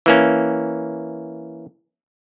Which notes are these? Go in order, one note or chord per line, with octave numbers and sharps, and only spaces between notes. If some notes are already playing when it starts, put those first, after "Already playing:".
E3 A#3 C#4